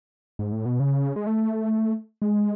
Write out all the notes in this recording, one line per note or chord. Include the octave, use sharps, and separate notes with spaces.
G#2
A2
B2
C#3
G#3
A3
G#3